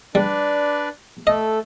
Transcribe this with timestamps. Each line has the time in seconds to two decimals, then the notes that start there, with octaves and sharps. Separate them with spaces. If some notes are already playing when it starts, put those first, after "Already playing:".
0.15 G3 D4 B4 D5
1.27 A3 A4 D#5